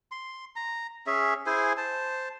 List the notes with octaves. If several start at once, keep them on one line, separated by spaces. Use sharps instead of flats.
C6
A#5
C#4 G#4 E5
E4 G#4 C5 G#5
C5 A5